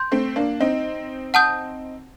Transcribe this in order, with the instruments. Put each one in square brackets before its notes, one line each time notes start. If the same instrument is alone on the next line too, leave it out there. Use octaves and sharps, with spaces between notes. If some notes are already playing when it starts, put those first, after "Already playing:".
Already playing: [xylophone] C6 G6
[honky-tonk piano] A3 C4
A#3 D4
C4 D#4
[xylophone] F#5 A5 D#6 G6